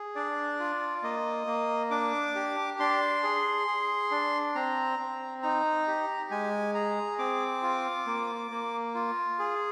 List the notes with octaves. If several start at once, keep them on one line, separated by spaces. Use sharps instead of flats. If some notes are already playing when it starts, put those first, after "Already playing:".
Already playing: G#4
D4 D5
F4
A#3 D#5
A#3
D4 D6
G4
D4 C6
G#4
G#4
D4
C4 A#5
C4
D#4 A#5
G4
G#3 G#5
G#4 A#5
C4 D6
F4
A#3
A#3
F4
G#4